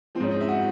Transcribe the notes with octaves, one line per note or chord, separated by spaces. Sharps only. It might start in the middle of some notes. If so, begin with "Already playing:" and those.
F3 C4
G#2 C#4
D#4
E4
F#4